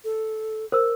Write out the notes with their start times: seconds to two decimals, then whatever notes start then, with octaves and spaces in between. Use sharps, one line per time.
0.05 A4
0.72 A#4 C5 E6